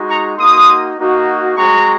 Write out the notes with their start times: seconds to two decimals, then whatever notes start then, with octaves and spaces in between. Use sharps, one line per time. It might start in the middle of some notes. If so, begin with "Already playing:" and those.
Already playing: G#3 D#4 F#4
0.09 A#5 C#6
0.38 A#3 D#4 F#4 C6 D#6
0.98 A#3 D#4 F#4
1.57 G#3 C4 F#4 A#5 C#6